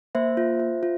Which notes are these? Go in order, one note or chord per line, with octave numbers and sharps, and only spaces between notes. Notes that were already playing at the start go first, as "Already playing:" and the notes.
A#3 C5 E5
F4
F4
F4